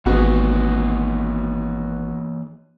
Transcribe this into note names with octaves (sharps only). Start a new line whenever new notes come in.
G#1 E3 A#3 B3 F#4 G#4